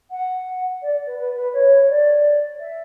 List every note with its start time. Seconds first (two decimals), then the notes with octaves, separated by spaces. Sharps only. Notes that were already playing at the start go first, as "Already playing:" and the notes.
0.11 F#5
0.82 D5
1.06 B4
1.18 B4
1.35 B4
1.53 C#5
1.88 D5
2.59 E5